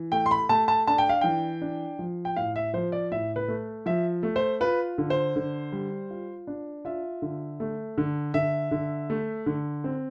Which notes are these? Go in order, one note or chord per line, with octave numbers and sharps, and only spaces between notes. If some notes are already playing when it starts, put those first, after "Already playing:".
Already playing: E3
A3 G5
C6
B5
A3 A5
A5
D4 A5
G5
F5
E3 G5
D4
F3
G5
A2 F5
E5
F3 C5
D5
A2 E5
B4
A3
F3 E5
A3
C5
F4 B4
D3
C5
D3
G3
F4
D4
F4 E5
D3
A3
D3
D3 E5
D3
A3
D3
C4